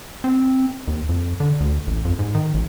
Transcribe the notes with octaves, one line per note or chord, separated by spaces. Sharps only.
C4
D#2
F2
D3
D2
A1
F2
G#2
D#3
A1